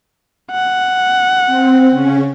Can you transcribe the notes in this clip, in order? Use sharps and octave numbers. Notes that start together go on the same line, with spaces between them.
F#5
C4
C#3 C#4